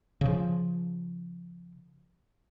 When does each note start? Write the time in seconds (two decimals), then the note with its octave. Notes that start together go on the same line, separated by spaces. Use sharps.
0.21 C#3 F3